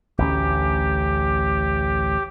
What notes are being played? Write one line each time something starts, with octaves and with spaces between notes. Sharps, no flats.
A1 D2 C#4 G4